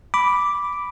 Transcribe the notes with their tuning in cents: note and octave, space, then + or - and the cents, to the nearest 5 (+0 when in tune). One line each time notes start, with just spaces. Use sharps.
B5 +0 D6 -5